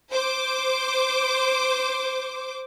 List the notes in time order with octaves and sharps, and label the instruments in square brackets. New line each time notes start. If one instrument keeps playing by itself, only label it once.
[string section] C5 D6